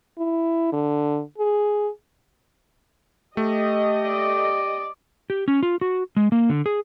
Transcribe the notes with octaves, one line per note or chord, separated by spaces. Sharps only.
E4
D3
G#4
A3 G4 D#5
D5
G4
C#4
F4
F#4
G#3
A#3
D3
G#4